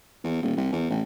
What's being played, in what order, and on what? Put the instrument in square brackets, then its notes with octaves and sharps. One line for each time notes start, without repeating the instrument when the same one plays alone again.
[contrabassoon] E2
D#1
C2
E2
A1